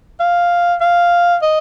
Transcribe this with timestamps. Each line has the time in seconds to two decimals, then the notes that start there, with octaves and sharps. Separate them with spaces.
0.20 F5
0.81 F5
1.42 D#5